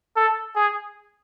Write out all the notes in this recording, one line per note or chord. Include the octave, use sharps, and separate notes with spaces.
A4
G#4